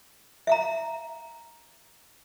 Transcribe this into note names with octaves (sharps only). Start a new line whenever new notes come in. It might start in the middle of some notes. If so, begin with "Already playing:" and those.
E5 F5 A#5